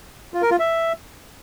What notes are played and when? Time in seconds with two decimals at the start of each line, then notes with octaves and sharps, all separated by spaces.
0.34 F4
0.42 A#4
0.51 F4
0.59 E5